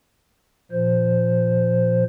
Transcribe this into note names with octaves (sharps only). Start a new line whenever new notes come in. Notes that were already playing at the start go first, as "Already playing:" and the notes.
A#2 F3 C5